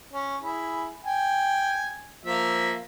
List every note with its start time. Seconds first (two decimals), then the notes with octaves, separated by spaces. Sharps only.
0.14 C#4
0.43 E4 G#4
1.05 G5 G#5
2.26 F3 A#3 E5